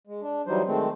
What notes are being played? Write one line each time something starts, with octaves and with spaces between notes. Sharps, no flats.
G#3
D4
E3 F#3 G3 D#4 C5
D#3 G#3 A3 C4